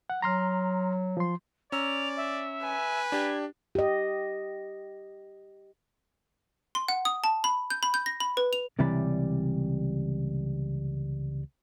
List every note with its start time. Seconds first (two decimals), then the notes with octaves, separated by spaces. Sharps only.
0.10 F#5
0.22 F#3 A#5 C6 F6
1.17 F3 C6
1.72 C#4 D5 A#5 E6 F7
2.17 E5
2.62 B4 G#5
3.12 D4 G4 G#6
3.75 G4 D#5
6.75 C6
6.88 F#5
7.05 D#6
7.24 A5
7.44 B5
7.70 G6
7.83 B5
7.94 G6
8.06 A#6
8.20 B5
8.37 B4
8.53 F7
8.79 C#2 C3 E3 G3 D5 B5